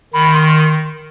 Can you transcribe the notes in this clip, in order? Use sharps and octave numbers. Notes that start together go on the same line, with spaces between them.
D#3 B5
C6